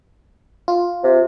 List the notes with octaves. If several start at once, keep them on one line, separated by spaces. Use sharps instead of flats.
F4
C3